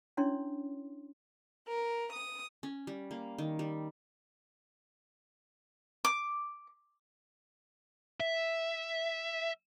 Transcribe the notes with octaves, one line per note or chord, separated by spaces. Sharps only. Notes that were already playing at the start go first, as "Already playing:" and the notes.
C#4 D4 E4 C#5 C6
A#4
D#6
C#4
G3
A#3
D#3
G3
D6
E5